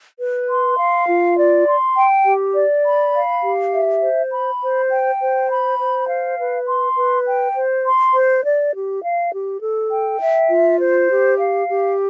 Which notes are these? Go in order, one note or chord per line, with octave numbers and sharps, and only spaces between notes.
B4
C6
F5
F4
D5
C6
G5
G4
D5
B5
F5
G4
E5
C5
B5
C5
G5
C5
B5
C5
F5
B4
C6
B4
G5
C5
C6
C5
D5
G4
F5
G4
A4
G5
E5
F4
C5
G4
F5
G4